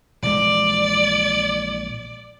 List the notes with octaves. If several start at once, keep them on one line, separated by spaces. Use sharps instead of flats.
A#1 E3 G#3 D5